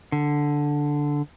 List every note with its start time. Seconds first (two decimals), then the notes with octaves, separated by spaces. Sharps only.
0.12 D3